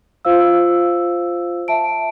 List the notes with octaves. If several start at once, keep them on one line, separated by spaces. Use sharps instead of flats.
F4 C5 F5 E6
E5 A5 D7